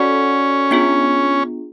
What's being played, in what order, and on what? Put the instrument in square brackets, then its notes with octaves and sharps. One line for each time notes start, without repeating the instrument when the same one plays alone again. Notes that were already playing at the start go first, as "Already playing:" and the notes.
Already playing: [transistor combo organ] C#4 [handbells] F#4 A4 D5 F#5
[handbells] B3 D4 F4 G#4